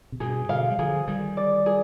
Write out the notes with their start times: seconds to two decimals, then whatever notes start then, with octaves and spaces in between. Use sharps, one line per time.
0.12 C3
0.20 G2 B2 G#4
0.49 B2 D3 F5
0.70 G3
0.78 D3 F3 G#4
1.07 D#3 G3 G#4
1.37 D5
1.66 G#4